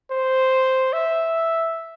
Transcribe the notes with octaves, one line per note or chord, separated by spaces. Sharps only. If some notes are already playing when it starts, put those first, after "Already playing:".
C5
E5